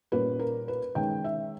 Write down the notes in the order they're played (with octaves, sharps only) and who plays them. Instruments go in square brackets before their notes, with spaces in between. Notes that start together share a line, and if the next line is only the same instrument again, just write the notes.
[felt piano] A#2 G3 A#3 C#4 B4
A#4
B4
D#3 G#3 C#4 G5
E5